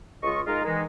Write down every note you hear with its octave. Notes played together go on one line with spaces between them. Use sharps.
C#2 F4 D#5 C#6
G#3 D#4 F4 A#4
D#3 E3 G#3 D#4